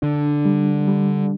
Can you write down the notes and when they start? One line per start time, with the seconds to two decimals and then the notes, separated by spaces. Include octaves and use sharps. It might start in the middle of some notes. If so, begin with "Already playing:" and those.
0.02 D3 D4
0.46 G3
0.88 G3